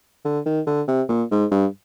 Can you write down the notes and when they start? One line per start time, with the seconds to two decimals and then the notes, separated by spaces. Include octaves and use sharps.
0.25 D3
0.46 D#3
0.67 D3
0.88 C3
1.09 A#2
1.31 G#2
1.51 G2